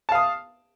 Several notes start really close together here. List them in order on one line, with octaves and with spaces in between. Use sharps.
A5 F5 D#6